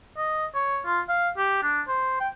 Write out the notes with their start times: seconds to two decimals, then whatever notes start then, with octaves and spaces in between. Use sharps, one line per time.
0.17 D#5
0.55 C#5
0.86 F4
1.09 F5
1.38 G4
1.63 D4
1.88 C5
2.20 G5